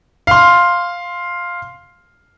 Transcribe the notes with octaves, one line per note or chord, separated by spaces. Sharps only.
F5 C6